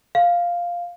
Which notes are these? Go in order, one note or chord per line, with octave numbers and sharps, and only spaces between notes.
F5